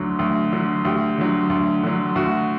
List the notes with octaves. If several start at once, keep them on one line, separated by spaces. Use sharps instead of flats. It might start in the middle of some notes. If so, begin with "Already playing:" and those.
Already playing: D2 D3 F#3
D2
D3 F#3
D2 G4
D3 F#3
D2
D3 F#3
D2 F#4